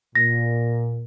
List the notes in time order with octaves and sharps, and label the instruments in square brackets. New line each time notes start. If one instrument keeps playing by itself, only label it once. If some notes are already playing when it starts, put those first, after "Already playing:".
[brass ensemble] A#2 [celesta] A#6